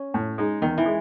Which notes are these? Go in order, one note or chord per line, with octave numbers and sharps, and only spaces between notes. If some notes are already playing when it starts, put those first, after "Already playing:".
Already playing: C#4
A2
G#3 D#4
E2 D#3
E3
G#3